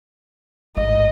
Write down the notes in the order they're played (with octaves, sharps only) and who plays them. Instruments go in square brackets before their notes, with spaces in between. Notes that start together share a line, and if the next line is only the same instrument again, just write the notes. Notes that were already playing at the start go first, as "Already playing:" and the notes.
[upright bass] A1 G#2 [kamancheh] D#5